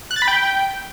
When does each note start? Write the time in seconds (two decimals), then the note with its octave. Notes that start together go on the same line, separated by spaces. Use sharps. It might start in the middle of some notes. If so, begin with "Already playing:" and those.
0.11 F#6
0.16 A6
0.22 B5
0.28 G5